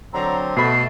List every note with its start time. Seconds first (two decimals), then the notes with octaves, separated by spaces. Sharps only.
0.13 D3 F#3 C4 A#5
0.57 B2 A3 B5 C7